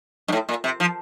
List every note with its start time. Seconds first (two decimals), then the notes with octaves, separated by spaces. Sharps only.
0.28 G2
0.32 A2
0.49 A#2
0.64 C3
0.80 F3